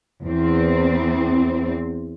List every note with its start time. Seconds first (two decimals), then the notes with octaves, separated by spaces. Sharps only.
0.24 E2 C4